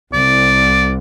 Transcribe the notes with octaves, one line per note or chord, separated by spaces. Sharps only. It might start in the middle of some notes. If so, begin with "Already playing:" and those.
C2 D5